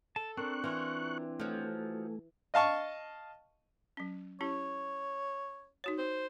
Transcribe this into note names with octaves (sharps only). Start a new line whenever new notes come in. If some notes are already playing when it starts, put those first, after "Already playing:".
A4 A5
C4 D4 A#4 C#6 F#6
E3 F4 A#4
F3 F#3 A3
D#5 F5 A5 C#6
F#3 C#4
C#4 E4 G4 C#5
D#4 F#4 C#5
C5